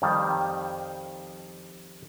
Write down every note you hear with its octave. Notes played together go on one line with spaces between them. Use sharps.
F2 D#3 G3